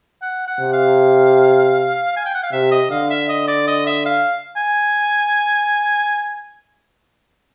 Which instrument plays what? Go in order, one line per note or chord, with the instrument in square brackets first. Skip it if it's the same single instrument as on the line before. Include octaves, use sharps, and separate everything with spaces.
[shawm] F#5
F#5
[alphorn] C3
[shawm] F5
G#5
G5
F#5
F5
[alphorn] C3 [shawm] E5
[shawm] D#5
[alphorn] D3 [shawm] F5
[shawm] E5
D#5
D5
D#5
E5
F5
G#5